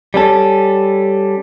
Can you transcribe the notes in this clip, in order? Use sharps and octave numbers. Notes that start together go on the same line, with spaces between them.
G3 C#4 A4